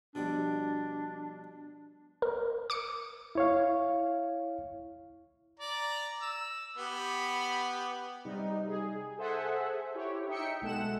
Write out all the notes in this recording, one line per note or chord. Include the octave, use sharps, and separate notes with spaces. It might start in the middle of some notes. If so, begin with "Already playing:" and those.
B2 F3 G3 D4
A#4
D6 C#7 D7
E4 C#5 F5
D5 A#5
E6
B3 G4 B5
C3 G3 D#4
G#4
G#4 A4 C5 E5 F#5 G#5
E4 G4 C#5
D#4 E5 G5 C#7
B1 G#3 A4 F#5 E7